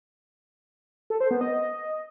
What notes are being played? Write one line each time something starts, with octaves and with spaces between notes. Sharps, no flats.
A4
C5
B3
D#5